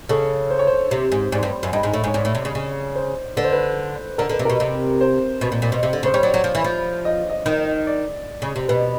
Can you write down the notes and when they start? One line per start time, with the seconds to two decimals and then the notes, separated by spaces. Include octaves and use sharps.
0.09 C#3 A4
0.50 C5
0.59 C#5
0.67 C5
0.91 C3
1.12 G#2
1.32 G#2 D5
1.43 G2
1.63 F#2
1.73 G2 D#5
1.83 G#2
1.93 A2
2.04 G#2
2.07 C#5
2.14 G#2 D5
2.25 A2
2.35 C3
2.45 C#3
2.55 C#3
2.95 C5
3.37 D3 B4
3.44 C5
3.53 B4
4.18 D3 A#4
4.29 D3
4.32 B4
4.39 C3
4.45 B2 A#4
4.60 C3
5.01 C5
5.41 B2
5.52 A#2
5.62 A#2
5.72 B2
5.83 C3
5.93 D3
6.03 C#3
6.06 C5
6.14 G3 C#5
6.23 F#3 D5
6.34 F#3
6.44 F3
6.55 E3
6.64 F3
7.05 D#5
7.30 D#5
7.46 D#3
7.87 D5
8.42 C#3
8.56 C3
8.68 B2 B4